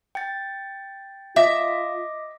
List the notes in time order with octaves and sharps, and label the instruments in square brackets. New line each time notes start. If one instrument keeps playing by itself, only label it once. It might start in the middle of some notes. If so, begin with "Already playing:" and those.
[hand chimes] G5 A6
[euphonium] F4 [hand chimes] D#5 D6 A#6 [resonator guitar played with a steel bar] E5